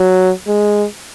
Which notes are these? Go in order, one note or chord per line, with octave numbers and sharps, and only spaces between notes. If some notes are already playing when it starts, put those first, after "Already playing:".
Already playing: F#3
G#3